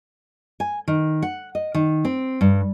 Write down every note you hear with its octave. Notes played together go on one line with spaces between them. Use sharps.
G#5
D#3
F#5
D#5
D#3
C4
G2